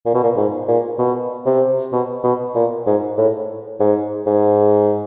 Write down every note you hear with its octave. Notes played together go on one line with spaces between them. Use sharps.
A#2
B2
A#2
G#2
A#2
B2
C3
B2
B2
A#2
G#2
A2
G#2
G#2